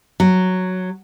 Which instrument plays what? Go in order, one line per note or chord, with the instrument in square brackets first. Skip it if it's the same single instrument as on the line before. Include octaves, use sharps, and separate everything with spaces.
[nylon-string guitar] F#3